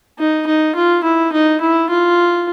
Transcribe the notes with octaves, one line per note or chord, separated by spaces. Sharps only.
D#4
D#4
F4
E4
D#4
E4
F4